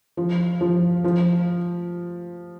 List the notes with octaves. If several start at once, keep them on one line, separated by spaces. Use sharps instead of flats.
F3
F3
F3